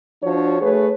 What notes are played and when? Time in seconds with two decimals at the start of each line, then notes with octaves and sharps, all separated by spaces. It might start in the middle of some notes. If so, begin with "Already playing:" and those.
0.23 F3 D4 F#4 C#5
0.61 A3 G#4 B4 C#5